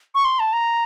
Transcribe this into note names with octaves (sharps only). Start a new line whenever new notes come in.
C#6
C6
A5
A#5